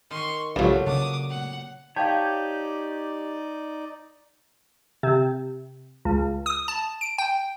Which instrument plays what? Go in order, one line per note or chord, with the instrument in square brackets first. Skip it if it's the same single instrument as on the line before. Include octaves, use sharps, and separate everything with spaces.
[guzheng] D#3 [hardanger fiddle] C6 C#6
[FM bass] B1 [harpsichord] G2 F3 [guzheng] A#2 C#3 F#3 [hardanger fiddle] A3
[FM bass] C#3 [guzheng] D4 [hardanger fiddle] D6 D#6
[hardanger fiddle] F#5
[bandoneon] D#4 D5 [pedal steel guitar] G4 C#5 [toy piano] F5 G5 A5
[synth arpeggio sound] C3
C#2
D#6
A5
D7
G5